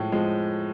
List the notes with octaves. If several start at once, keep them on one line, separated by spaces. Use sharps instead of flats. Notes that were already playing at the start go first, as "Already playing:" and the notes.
Already playing: A2 F3 G#3
F3 G#3